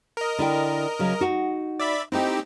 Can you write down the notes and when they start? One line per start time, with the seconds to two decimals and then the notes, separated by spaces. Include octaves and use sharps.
0.17 A#4 D#5
0.39 D3 E4 G5
0.99 C#3 F#3
1.20 D#4 F#4
1.80 D5 E5 B5
2.12 A3 C4 D#4 E4 G4